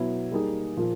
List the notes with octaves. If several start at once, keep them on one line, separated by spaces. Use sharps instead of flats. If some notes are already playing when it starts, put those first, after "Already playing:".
Already playing: B2 F#3 B3 E4
G3 A#3 D#4 G#4
A#2 F3 A#3